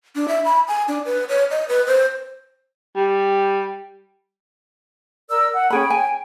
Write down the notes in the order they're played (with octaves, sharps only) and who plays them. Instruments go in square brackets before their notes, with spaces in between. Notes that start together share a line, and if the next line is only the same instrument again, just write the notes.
[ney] D4
E5
B5
G#5
D4
B4
C#5
D#5
B4
C5
[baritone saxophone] G3
[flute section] A#4 D5 E6
F#5
[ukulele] C#4 G#4 B5 [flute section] G5
[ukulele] G#5